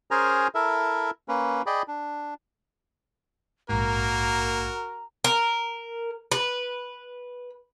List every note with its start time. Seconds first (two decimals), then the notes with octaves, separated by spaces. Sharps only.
0.11 C#4 G#4 A#4 C5 G#5 A#5
0.55 E4 A4 A#4 E5
1.28 A#3 C#4 B4
1.66 G#4 D5 D#5 G5 B5
1.88 D4
3.69 A#1 G#2 A#3 F#4 A#4 A#5
5.24 A#4
6.32 B4